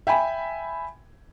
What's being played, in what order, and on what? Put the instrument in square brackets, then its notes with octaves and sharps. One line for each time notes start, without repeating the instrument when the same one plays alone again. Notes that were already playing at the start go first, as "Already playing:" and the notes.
[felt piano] E5 G5 G#5 B5